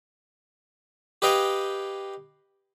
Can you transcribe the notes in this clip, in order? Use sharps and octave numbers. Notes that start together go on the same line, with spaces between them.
G4 B4 D#5 F5 G5 G#5